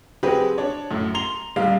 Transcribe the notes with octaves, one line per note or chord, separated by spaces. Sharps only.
F#3 C4 G4 G#4 B4
D4 C#5
F#2 A2
A#5 C6 F7 G7
D#1 G3 F5